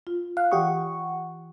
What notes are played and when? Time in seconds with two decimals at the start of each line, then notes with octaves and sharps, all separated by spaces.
0.07 F4
0.37 F5 F#6
0.52 E3 G4 D5 F#5 C#6 D#6